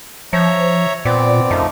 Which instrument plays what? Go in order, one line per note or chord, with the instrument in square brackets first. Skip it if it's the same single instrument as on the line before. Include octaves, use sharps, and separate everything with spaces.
[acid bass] F3 [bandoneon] C#5 E5 A#5
[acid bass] A#2 [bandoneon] B3 C4 D5
[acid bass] F#2 [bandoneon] F3 A3 D#4